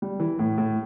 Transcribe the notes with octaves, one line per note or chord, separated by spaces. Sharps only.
G3
E3
A2
A2